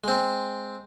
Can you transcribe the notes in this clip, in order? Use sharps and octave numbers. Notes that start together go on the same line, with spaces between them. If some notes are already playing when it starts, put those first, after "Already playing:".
G#3 C4